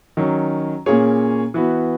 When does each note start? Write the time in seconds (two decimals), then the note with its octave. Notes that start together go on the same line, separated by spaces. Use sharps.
0.17 D#3 F#3 C#4
0.86 A#2 A#3 C#4 G#4 C#5
1.54 E3 B3 F#4